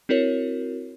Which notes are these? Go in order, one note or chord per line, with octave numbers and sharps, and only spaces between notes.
C4 E4 F#4 A#4 C#5